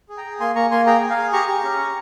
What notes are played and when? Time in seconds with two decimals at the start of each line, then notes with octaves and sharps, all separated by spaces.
0.09 G#4
0.17 G5 A#5
0.24 G#4
0.40 A#3 G#5 C6
0.55 A#3 A#5 C#6
0.71 A#3 G#5 C6
0.87 G#4 G5 A#5
1.01 G#4
1.10 F5 G#5
1.17 G#4
1.33 G4 A#5 C#6
1.49 G4
1.64 C#4
1.79 G4